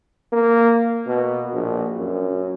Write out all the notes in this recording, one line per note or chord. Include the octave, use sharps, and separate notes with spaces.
A#3
B2
A#1
F#2